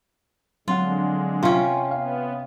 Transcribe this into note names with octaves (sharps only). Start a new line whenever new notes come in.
D3 F#3 G#3 C4 F4 F#5
C3 C#4 F4
B3 F5